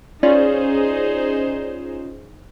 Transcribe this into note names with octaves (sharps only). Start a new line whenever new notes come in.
C#4 D#4 F4 G#4 C5 D5